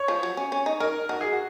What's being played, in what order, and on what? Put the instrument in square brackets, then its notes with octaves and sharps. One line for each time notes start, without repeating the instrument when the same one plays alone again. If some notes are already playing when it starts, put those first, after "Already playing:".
Already playing: [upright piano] C#5
[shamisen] F3
F#3
C#4
C#4
D#4
[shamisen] D#4 [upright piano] A#4
[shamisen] D#4 [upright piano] F#4
[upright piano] G#4
F#4